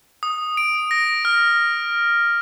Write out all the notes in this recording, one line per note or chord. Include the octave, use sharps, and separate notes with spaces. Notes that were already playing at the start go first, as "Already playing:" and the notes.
D#6
D7
A#6
F6